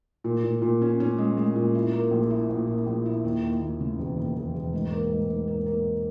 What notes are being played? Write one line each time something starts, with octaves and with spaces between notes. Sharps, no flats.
A#2
A#2
A#2
C#4
C#4
G#3
G#3
A#2
E4
A#3
A#1
E4
A#1
A#2
A#1
E4
D#2
D#2
D#2
C#3
E1
D#2
E1
E1
G#2
A#3
G#2
G#2
A#3
A#3